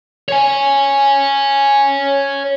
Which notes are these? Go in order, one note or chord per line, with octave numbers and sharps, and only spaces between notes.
C#5 G#5